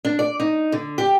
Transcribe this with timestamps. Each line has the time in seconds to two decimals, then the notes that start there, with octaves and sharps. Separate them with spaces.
0.05 D4
0.19 D5
0.40 D#4
0.72 D3
0.98 G4